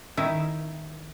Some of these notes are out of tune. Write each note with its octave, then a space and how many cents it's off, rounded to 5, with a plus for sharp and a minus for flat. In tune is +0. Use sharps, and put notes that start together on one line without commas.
D#3 +0 E4 +0